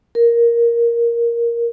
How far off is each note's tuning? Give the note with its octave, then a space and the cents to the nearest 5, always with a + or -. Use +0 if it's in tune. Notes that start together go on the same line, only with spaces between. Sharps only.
A#4 +5